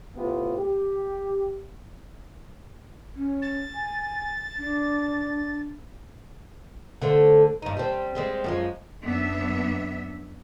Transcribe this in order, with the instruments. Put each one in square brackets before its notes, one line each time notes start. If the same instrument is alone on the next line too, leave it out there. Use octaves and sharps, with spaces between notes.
[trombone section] A2 C3 B3 F4
G4
[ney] C#4
[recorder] A6
[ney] G#5
D4
[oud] D3 A3 C4
G2 D#4
G3 C4
G3 G#3 C4
F#2 F3 G#3
[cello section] F#2 B3 D4 E5